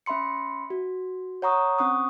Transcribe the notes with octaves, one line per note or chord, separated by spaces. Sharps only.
C#4 E5 B5 C6 C#7
F#4
C#5 F#5 A#5 C#6 D#6
C4 C#4 F#5 C#6 D#6